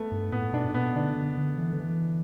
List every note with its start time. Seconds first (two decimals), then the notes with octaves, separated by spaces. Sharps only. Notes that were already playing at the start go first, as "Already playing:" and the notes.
Already playing: A3 B3
0.12 G2
0.32 A2 B3
0.53 B2 D4
0.74 B2 B3
0.95 D3 D4
1.16 D3
1.37 D3
1.58 E3
1.73 D3
1.80 E3